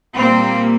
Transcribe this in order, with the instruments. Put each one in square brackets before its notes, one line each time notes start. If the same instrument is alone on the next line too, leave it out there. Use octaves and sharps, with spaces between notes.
[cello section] A#2 G3 A#3 C4